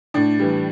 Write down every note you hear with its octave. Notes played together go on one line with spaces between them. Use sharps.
A2 D4
E3 G3